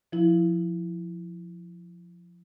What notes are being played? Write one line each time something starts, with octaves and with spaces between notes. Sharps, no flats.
F3 E4